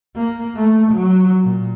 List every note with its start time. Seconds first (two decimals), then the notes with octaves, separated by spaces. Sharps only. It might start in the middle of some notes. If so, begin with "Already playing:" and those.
0.16 A#3
0.56 A3
0.93 F#3
1.44 A#2